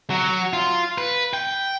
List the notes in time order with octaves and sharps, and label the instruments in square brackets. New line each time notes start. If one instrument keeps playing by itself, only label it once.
[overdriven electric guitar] F#3
F4
B4
G5